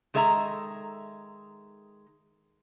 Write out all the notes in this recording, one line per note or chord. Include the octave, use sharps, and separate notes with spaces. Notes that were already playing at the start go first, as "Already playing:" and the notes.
D#3 G#3 A4 E5 A#5